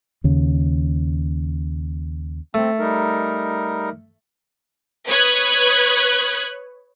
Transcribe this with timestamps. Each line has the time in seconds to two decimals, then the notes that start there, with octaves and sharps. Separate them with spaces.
0.24 D#2 C#3
2.54 A3 C4
2.79 G3 D#4 A#4
5.07 B4 C#5 D#6 F#6 G#6